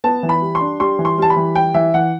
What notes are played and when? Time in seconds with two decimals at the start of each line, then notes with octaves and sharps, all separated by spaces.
0.04 B3 A5
0.23 E3
0.29 B5
0.42 G3
0.55 C6
0.61 D4
0.80 G3 C6
0.99 E3
1.05 C6
1.18 G3 A5
1.30 B5
1.36 E3
1.55 G3 G5
1.74 E3 E5
1.94 E3 F#5